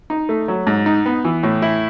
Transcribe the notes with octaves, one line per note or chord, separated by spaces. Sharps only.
D#4
A3
F#3
G#2
D#4
B3
E3
A2
E4